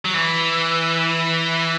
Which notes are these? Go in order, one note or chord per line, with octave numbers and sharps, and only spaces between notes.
F#3
E3